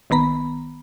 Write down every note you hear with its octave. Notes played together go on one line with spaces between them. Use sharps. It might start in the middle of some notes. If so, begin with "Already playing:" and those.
A#1 D#3 B3 A#5 B5